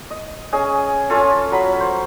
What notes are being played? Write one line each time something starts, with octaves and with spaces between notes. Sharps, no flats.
D#5
C#4 G#4 D#5 G#5
C#4 F4 A4
F#3 B5
C5